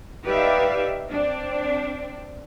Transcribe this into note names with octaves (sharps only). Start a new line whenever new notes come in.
D#4 G4 B4 D5 E5 F5
C4 D4